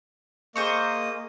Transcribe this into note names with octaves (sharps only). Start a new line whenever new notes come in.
A#3 G#4 C5 D#5 C#6